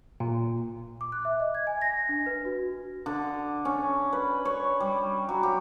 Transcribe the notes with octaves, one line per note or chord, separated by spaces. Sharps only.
A#2
D6
F#6
E5
D#5
G#6
G#5
A#6
D4
B4
F#4
D3
C#4
B4
C#5
G3
F#3
G4